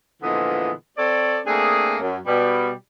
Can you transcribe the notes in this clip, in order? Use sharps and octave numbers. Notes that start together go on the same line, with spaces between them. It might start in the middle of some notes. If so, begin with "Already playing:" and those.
A#2 D3 E3 F3 G#3 B3
C4 A4 C#5 D5
A3 A#3 C4 D4 G#4
F#2
B2 G3